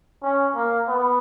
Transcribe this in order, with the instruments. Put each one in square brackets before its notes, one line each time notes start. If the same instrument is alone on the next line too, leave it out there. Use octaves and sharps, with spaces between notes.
[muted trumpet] C#4
A#3
B3